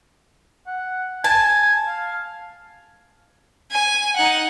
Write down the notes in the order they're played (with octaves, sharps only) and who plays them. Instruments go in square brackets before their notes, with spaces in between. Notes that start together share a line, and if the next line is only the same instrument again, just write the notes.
[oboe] F#5
[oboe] G#5 [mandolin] A5
[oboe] F5
[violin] G#5
D#4 F#5